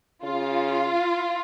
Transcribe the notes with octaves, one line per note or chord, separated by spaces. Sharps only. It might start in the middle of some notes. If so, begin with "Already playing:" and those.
C#3 F4